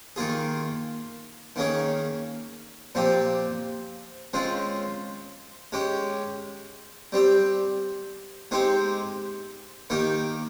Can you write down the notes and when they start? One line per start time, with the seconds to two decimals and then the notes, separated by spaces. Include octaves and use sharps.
0.16 D#3 A#3 F4 G#4
1.56 D#3 A#3 C#4 G#4
2.95 A#2 F3 C4 G4
4.33 C#3 G#3 C4 F4
5.72 G#3 C#4 G4
7.12 G3 C4 G4
8.51 G#3 C4 D#4 G4
9.90 D#3 A#3 D#4 G4